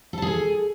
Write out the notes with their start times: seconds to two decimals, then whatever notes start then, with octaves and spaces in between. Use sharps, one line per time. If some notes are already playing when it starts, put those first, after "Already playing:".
0.13 A4
0.18 A5
0.22 G#4
0.27 G#5